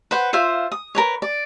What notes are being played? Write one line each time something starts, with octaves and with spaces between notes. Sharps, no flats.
B4 C5 F#5
F4 C5 E5 F5
D#6
A#4 B4 C#5
D5